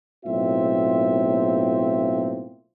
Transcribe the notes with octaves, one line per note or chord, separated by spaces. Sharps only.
B1 A2 A#3 C4 F4 E5